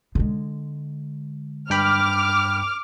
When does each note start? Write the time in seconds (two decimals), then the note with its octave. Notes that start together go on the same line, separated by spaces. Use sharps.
0.15 D3 G#3
1.70 G2 G5 B5 D6 F6